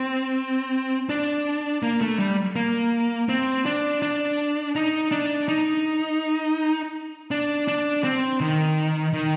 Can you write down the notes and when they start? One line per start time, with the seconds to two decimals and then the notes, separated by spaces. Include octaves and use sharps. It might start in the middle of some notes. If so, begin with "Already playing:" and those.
Already playing: C4
1.09 D4
1.83 A#3
2.01 A3
2.19 G3
2.56 A#3
3.29 C4
3.66 D4
4.02 D4
4.76 D#4
5.12 D4
5.48 D#4
7.31 D4
7.68 D4
8.04 C4
8.41 D#3
9.13 D#3